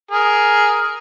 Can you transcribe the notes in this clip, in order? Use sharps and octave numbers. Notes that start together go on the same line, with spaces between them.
G#4 A#4